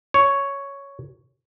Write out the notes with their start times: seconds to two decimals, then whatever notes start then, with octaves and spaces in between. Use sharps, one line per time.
0.14 C#5